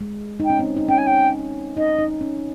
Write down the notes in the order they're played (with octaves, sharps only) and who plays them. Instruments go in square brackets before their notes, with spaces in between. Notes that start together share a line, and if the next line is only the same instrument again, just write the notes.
[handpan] G#3
D#4
[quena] G5
[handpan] C#4
C4
D#4
[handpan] C#4 [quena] G5
[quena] G#5
G5
[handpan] D#4 [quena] D#5
[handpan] D#4
C#4